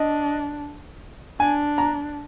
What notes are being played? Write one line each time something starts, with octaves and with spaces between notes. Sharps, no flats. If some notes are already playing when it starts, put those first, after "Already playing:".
Already playing: D4 D#5
D4 G#5
A#5